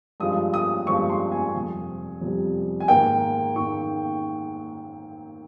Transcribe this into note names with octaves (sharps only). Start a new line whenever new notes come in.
G2 F3 G#3 D#6
D#6
G2 F3 G#3 C#6
C6
G#5
F2 C3 G3
F2 C3 G3
G#5
G#2 D#3 A#3 G5
G#2 D#3 A#3 C#6